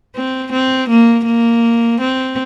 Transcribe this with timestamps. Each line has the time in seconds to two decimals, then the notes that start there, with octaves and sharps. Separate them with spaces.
0.16 C4
0.52 C4
0.89 A#3
1.26 A#3
2.00 C4